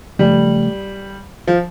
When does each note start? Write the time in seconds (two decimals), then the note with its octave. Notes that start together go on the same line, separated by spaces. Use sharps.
0.19 C#3 F3 G3 A3
1.47 F3